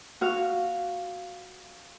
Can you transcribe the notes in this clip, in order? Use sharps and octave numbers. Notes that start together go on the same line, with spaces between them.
F#4 F5 F6